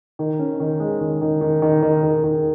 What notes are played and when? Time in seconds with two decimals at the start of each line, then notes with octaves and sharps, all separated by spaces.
0.19 D#3
0.39 C#4
0.60 D#3
0.80 G#3
1.00 D#3
1.21 D#3
1.41 D#3
1.62 D#3
1.82 D#3
2.03 D#3
2.24 D#3